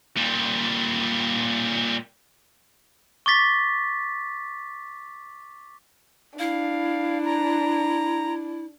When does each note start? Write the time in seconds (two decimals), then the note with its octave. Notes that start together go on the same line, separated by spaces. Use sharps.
0.17 A#2 G3
3.26 C#6 D6 A6 B6
6.39 D4 E4 F5
7.25 A#5